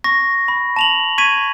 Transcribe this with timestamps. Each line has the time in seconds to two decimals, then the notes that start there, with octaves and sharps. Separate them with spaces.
0.04 C#6 A#6
0.48 B5
0.76 A5 F7 F#7
1.18 C#6 G#6 B6 D#7